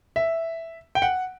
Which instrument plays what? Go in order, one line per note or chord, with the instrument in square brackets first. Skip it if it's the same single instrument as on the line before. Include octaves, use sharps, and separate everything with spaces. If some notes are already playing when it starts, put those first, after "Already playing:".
[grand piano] E5
G5
F#5